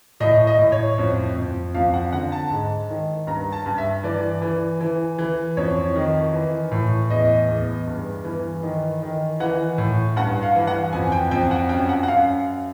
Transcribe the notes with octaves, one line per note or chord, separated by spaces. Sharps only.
A2 D#5
D#5
A2
C#5
F2
F2
F2 F5
F#5
D3 F#5
A5
G#2
D#3
G2 A#5
A5
G2
E5
E3 D5
E3
E3
E3
F2 C#5
D#3
E3
A2
E2 D#5
E2
G2
E3
D#3
D#3
E3 F#5
A2
G2 F#5
F5
E3
F#5
F2 G#5
G5
F2 G5
F#5
F#2 G5
F#5
F#5
F#2 F5